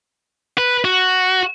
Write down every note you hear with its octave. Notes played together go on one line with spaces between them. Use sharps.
B4
F#4